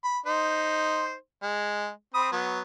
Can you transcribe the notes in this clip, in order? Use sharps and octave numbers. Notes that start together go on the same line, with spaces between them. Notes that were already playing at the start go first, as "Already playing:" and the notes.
B5
D#4 C5
G#3
C4 B5 D#6
F#3 B3